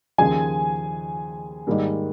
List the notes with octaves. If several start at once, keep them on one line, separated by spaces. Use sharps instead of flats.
D#2 C#3 F3 G#4 G#5
G#2 D#3 G3 A#3